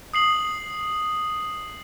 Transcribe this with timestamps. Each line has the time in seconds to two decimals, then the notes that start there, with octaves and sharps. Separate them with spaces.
0.13 D#6 C7 F#7